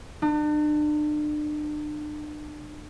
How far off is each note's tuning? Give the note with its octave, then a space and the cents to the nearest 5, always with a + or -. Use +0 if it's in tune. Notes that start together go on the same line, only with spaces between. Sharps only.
D4 +40